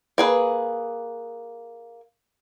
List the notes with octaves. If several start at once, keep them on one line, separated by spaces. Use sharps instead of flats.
A#3 G#4 B4